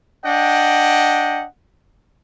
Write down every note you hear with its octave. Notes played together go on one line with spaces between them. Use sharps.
D4 D#5 F#5 G5